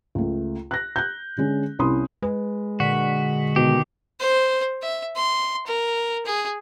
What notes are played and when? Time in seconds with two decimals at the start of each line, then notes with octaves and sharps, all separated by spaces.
0.15 C#2 A3
0.71 F#6 A#6
0.96 F#6 G6
1.38 D3 G#3 C#4
1.79 C2 C#4 E4 B5 C6 D#6
2.22 G#3 B4
2.80 A#2 D3 F#4 B6
3.56 B2 D#3 G4
4.20 C5
4.82 E5
5.16 C6
5.67 A#4
6.26 G#4